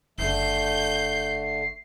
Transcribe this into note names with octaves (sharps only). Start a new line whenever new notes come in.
F#1 D3 A3 G6 C7